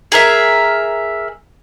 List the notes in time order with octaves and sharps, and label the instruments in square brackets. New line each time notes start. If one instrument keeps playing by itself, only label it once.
[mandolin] G#4 A#4 E5